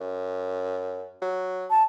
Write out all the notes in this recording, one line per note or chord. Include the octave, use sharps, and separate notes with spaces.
F#2
F#3
A5